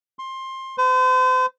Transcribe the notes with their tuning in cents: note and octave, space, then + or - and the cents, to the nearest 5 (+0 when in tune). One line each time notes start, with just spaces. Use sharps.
C6 +20
C5 -40